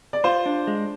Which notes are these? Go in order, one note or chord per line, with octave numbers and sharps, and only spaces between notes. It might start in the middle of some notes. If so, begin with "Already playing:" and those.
D5
F4 C5
D4
G#3